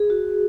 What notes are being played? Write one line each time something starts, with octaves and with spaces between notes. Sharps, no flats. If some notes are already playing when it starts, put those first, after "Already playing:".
Already playing: G#4
F#4